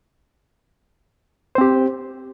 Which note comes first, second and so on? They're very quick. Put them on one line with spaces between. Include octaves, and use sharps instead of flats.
C5 C4 G4